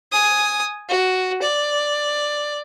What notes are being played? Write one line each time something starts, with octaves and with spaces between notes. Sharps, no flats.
G#5 D#6
F#4
D5